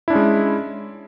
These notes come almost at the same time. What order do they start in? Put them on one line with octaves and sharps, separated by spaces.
E4 D4 C#4 G#3